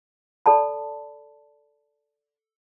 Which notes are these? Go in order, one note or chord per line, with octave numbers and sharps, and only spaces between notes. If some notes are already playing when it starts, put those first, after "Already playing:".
A4 D5 A5 B5